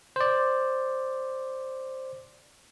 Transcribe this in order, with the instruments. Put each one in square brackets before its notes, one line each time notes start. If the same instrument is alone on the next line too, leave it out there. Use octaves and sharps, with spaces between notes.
[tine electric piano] C5 D5